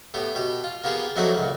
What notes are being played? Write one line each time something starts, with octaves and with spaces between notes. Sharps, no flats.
A2 B3 G4
B2 G4
F4
A#3 B3 F4 G4 G#4
F2 E3 F#3 A3 D#4 F#5
C#2 A#2